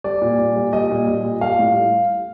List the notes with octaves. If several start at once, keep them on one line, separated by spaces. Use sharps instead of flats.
G3 D5
A#2
A#2
G3
G3 D#5
A#2
A#2
G3
G3 F5
A2